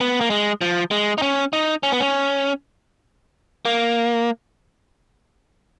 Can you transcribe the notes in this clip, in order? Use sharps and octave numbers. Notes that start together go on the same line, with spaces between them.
B3
A#3
G#3
F3
G#3
D#4
C#4
D#4
C#4
B3
C#4
A#3